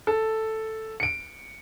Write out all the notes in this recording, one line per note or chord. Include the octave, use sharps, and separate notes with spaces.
A4
C#7 D7